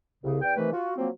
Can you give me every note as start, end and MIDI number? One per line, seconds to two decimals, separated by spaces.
0.24 0.39 36
0.24 0.39 49
0.42 0.56 40
0.42 0.56 74
0.42 0.56 79
0.57 0.72 48
0.57 0.72 51
0.57 0.72 52
0.57 0.72 57
0.57 0.72 71
0.73 0.92 65
0.73 0.92 66
0.97 1.09 53
0.97 1.09 54
0.97 1.09 58
0.97 1.09 60